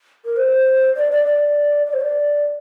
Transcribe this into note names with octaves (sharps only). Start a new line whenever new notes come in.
A#4
C5
D5
D5
D5
D5
C5
D5